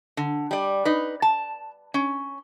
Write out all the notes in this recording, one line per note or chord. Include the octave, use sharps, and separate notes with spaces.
D3
G3 D5
D#4 B4
A5
C#4